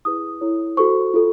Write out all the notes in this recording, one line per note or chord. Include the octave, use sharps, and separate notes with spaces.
E4 G#4 B4 D#6
E4 A4 C#5
F#4 A4 C5 C#6
F4 A4